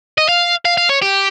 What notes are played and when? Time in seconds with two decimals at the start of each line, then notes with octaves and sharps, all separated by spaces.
0.18 D#5
0.29 F5
0.65 F5
0.77 F5
0.89 C#5
1.02 G4